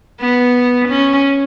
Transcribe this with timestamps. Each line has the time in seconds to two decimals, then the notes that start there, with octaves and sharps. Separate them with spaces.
0.20 B3
0.88 C#4